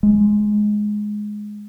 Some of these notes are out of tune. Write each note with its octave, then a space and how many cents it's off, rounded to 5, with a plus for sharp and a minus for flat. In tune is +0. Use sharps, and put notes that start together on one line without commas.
G#3 +10